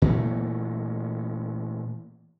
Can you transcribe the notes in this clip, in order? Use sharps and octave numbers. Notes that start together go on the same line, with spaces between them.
A#2 E3 F#3 A3